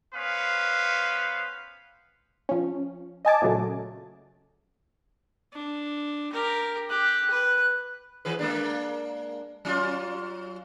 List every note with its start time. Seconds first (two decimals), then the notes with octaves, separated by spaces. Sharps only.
0.14 B3 C#4 B4 C5 F5
2.49 F3 C#4
3.25 D#5 G#5 A5 D6
3.42 A#2 C#3 F#3 A3
5.53 D4
6.32 G4 A#4
6.90 G4 F#6
7.30 B4
8.25 E3 G#4 B4
8.39 G#3 A#3 D4
9.65 F#3 C#4 F4